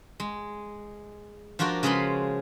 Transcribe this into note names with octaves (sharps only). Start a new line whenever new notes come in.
G#3
F3 D4 F4 F#4 A#4
C#3 G#3 G#4 B4 B5 C6